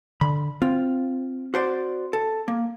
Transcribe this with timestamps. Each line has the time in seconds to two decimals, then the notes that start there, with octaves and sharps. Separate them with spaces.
0.21 D3 B5
0.62 C4 F4
1.54 F#4 C5 D5
2.13 A4
2.48 A#3